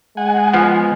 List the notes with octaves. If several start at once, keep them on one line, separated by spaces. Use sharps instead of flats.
G#3 F#5 G#5
F3 B3